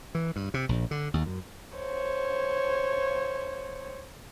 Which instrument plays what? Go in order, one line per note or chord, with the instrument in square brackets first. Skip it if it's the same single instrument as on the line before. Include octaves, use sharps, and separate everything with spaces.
[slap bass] E3
G2
C3
A#1
D3
D#2
F#2
[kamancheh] C5 C#5